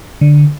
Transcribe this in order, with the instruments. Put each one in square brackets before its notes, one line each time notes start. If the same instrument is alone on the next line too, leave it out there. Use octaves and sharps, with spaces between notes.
[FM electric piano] D3